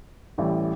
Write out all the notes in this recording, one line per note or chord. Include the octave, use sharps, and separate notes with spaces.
A1 A2 E3 G3 E4